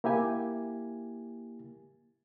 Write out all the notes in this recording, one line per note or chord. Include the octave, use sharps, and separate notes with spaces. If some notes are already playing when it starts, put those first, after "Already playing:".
A#3 E4 G4 G#5